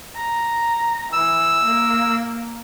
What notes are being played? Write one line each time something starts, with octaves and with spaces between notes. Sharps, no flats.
A#5
E3 E6
A#3